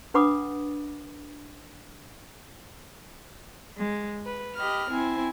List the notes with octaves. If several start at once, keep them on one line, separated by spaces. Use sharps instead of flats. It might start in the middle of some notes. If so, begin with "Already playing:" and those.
D4 B4 F#5 B5 D6 D#6
G#3
B4
G4 D#5 B5 F6
C4 E4 G#5